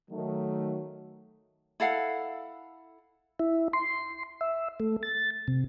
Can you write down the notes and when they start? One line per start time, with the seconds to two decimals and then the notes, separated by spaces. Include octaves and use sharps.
0.11 D#3 F#3 A3
1.80 E4 A4 F5 F#5
3.39 E4
3.73 C6
4.41 E5
4.80 A3
5.03 A6
5.48 C3